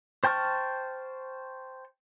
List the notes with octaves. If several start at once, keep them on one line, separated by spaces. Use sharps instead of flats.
C5 G5 A5 C#6 F6